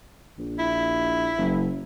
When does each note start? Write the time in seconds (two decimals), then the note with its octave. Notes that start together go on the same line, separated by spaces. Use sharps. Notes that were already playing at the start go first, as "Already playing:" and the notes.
0.38 A#1
0.59 E4
1.38 F#1